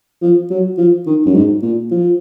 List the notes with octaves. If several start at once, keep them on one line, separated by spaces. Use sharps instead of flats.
F3
F#3
F3
D#3
F#2
G#2
A#2
F3